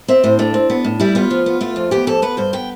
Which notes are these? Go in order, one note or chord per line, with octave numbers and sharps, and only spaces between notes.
C4 E5
A2 C5
A3 D4
C4
B3
A2
G3 E4
B3 F4
F3
B3
A3 F4
F2
B3 G4
F2 A4
B3 B4
G2 C5
B3 G5